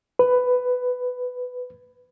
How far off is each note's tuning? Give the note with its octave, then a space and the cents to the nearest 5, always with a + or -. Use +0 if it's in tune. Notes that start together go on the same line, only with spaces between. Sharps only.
B4 +10